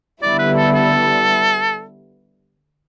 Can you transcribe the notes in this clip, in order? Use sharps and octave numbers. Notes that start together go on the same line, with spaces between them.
D3 G3 B3 E4 D5
B4
A4
A4